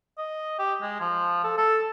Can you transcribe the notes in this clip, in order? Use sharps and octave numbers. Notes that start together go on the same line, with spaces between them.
D#5
G4
G#3
F3
A4
A4